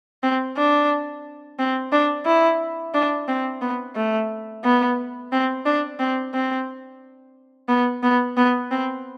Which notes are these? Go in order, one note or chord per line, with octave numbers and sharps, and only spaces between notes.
C4
D4
C4
D4
E4
D4
C4
B3
A3
B3
C4
D4
C4
C4
B3
B3
B3
C4